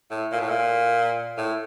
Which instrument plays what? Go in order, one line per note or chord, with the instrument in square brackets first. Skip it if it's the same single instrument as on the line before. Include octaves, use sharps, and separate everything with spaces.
[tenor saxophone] A2
A#2
A2
A#2
A2